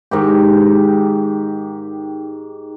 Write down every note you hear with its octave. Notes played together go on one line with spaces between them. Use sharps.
G#2 D#3 G4